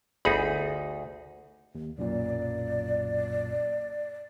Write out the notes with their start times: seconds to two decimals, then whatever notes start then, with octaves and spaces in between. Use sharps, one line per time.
0.25 G1 D2 D#4 G#4 B5
1.75 D#2
1.98 B1 F#2 A#2 D5